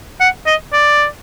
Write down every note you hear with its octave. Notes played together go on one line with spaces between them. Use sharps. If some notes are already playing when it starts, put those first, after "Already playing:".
F#5
D#5
D5